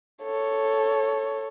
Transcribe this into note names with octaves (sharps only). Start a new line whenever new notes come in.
A4 C#5